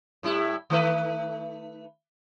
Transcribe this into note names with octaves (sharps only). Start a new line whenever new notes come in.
A2 G3 E4
D#3 A3 B4